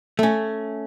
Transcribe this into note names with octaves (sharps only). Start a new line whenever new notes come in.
A3 C#4